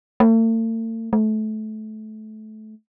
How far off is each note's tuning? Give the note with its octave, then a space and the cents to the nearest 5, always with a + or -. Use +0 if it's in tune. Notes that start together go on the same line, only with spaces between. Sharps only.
A3 +45
A3 -25